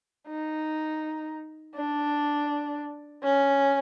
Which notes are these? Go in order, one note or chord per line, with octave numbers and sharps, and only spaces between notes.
D#4
D4
C#4